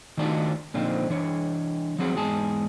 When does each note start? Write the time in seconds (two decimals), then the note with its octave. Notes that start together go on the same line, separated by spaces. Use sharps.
0.17 D#3 A3 D4 D#4 F4 F#4
0.74 A#2 D3 F3 C4 D#4
1.10 E3 D4 C#5
1.99 F3 F#3 C4 G#4 F#5
2.14 E2 G#2 G#3 G#4 A5